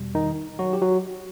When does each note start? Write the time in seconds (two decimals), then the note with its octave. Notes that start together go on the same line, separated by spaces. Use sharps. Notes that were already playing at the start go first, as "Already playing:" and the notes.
Already playing: E2 B2 G3
0.15 D#3 D#4
0.59 F#3 F#4
0.73 G4
0.81 F#3 F#4